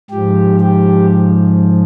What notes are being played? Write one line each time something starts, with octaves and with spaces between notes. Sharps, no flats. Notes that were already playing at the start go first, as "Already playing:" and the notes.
G#2 F3 G4
G4